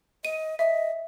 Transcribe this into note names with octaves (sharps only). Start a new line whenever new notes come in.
D#5 D#7
D#5 E5